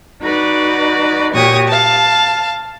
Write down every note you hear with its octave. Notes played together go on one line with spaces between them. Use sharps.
D#4 F#4 B4 D5
A#2 F#4 G4 C#5 C#6 D#6
F5 A5